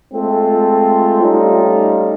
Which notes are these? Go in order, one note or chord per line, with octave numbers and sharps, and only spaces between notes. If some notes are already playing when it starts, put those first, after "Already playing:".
G#3 A3 C4 F4 A4
G3 A3 C#4 D#4 F4